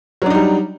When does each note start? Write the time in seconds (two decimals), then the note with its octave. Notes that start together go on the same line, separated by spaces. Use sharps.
0.22 F#3
0.26 D4
0.30 D#4
0.35 G3